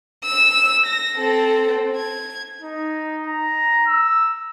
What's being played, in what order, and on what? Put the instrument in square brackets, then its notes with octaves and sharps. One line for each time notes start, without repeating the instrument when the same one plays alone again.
[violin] E6
A#6
C4 A4
G#6
[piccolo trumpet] D#4
A#5
E6